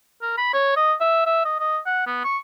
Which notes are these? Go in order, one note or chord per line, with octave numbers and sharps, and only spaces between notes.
A#4
B5
C#5
D#5
E5
E5
D#5
D#5
F#5
B3
C#6